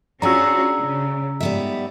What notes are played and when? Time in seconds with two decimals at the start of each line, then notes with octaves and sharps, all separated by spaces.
0.22 C#4 D4 F4 F#4 G#4 A#5 E6
0.81 C#3
1.40 G#2 G3 B3 E5